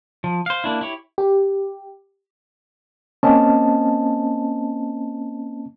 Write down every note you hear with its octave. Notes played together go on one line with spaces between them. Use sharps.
F3
C5 F5
A#3 D4 E4
E4 G4 C#5
G4
A#3 C4 C#4 C5 D#5 A5